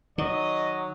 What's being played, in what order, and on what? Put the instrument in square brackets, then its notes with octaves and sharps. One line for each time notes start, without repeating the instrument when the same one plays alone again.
[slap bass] D#3 [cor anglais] F#3 [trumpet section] D#5